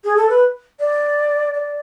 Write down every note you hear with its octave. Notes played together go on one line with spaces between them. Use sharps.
G#4
A4
B4
D5
D5